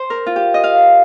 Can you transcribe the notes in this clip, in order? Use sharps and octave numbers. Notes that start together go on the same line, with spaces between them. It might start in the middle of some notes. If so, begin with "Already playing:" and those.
Already playing: C5
A#4
F4
G4
D#5
F5